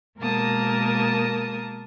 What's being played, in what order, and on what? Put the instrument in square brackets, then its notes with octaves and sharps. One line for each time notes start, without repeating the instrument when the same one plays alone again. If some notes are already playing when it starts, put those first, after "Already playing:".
[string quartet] B2 G#3 A#3 A#4 A5 D#6